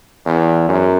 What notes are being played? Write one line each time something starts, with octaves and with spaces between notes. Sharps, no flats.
E2
F#2